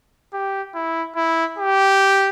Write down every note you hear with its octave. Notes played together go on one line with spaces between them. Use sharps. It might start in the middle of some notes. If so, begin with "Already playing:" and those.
G4
E4
E4
G4